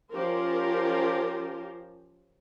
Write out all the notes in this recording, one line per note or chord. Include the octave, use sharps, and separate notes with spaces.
F3 C#4 F4 G4 A#4 C5